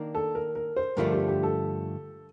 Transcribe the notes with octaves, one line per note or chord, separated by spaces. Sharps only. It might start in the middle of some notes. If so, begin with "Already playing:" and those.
Already playing: D#3 A#3 D4
A4
A#4
A#4
C5
G2 D3 F3 A3 D4 A#4
G4
G4
A4